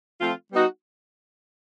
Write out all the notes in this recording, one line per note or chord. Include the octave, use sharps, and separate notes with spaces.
F3 A3 C4 F4
G3 B3 D#4 F#4